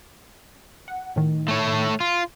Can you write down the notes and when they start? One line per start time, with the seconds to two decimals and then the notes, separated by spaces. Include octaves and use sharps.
0.88 F#5
1.16 A2 D#3
1.48 A3 C#5
2.00 F4